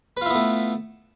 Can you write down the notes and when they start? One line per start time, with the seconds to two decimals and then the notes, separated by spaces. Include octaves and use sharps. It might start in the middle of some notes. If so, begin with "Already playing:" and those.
0.17 B4
0.21 F4
0.26 E4
0.30 B3
0.35 A3